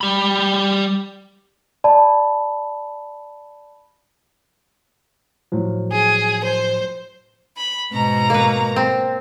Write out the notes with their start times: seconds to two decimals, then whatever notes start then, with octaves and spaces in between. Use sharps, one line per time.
0.01 G3 B5
1.84 D5 A5 B5
5.52 A2 F3 F#3
5.92 G#4
6.44 C5
7.57 B5
7.93 G#2 B2 A#5
8.30 A#3 B4
8.76 C4